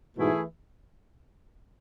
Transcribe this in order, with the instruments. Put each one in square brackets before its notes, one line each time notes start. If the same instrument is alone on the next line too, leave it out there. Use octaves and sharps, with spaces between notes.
[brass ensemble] G#2 B2 [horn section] E3 A3 E4 G#4